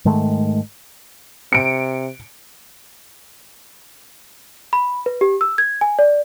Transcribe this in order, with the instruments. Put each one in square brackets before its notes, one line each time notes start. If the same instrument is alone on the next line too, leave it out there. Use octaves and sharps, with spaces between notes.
[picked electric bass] G#2 D#3 G#3 A3
[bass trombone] C3 [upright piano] C#7 D7
[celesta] B5
B4
G4
E6
G#6
G#5
D5